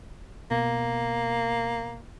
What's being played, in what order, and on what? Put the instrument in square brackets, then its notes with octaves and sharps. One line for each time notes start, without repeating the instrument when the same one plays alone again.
[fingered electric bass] B2 [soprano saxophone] A#3